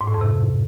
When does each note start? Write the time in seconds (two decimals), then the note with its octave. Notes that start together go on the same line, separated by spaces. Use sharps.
0.01 G#2
0.07 A2
0.14 F2
0.21 C3